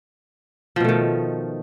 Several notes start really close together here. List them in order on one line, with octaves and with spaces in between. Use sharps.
F3 B2 A3 D#3